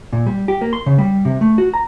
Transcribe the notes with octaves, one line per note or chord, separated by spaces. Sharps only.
A#2
G3
G4
A#3
C6
C#3
G3
C3
A3
F#4
A#5